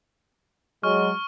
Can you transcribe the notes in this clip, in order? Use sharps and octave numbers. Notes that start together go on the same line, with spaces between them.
F#3 G#3 C#6 F6